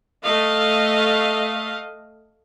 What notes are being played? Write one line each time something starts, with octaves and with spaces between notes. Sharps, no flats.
A3 D#5 F5